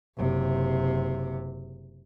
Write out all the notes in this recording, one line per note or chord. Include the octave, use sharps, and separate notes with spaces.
F#1 C3